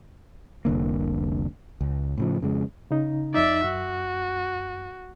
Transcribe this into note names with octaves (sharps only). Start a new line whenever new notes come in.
F1 C2 D3 A#3
C#2
A2 C#3 F3
F2 C#3 G#3
C#3 D#4
F2 D#4 D5 E5
F#2 F#4